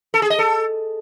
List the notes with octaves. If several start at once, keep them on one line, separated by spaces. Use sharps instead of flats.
A4
G#4
D#5
A4